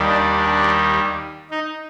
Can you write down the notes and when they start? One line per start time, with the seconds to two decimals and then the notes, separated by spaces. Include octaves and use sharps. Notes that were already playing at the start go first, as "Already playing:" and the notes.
Already playing: D#2 D#3 G3
0.09 D4
0.37 D4
1.50 D#4